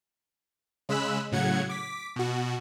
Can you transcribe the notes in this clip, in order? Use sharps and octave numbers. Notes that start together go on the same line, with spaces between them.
C#3 G#3 B5 E6 F#6
A2 C#3 F#3 F#5 G#6 C#7
D6 B6
B2 F#4